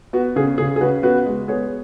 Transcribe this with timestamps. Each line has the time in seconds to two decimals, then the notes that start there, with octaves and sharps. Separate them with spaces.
0.13 B3 F#4
0.36 C#3 G#4
0.58 C#3 G#4
0.76 G#4
0.81 C#3 F#4 B4
1.03 B3 F#4 B4
1.26 G#3
1.48 B3 G#4 C#5